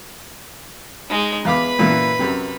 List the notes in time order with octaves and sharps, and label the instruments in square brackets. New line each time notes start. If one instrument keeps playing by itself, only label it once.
[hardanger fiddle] G#3 D#4
[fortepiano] E2 F5 D6 [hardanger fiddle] B4 B5
[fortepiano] F#2 A#2 E3
F#2 C3